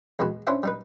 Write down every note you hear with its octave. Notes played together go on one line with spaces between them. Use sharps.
E2 G#3 B3 F#4
C#4 D4 E4 C5 E5 F#5
G3 D#4 B4